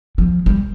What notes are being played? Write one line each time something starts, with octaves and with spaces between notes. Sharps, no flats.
F3
G3